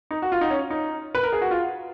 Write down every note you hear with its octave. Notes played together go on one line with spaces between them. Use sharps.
D#4
F#4
F4
D#4
C#4
D#4
B4
A#4
G#4
F#4
F4